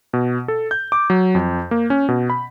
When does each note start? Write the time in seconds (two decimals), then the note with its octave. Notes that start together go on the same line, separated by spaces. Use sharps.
0.13 B2
0.48 A4
0.71 G6
0.92 D6
1.10 F#3
1.35 F2
1.71 A#3
1.90 C#4
2.09 B2
2.30 B5